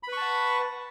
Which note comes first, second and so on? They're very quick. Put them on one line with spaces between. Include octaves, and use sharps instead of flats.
B5 B4 C#6 A5 F#5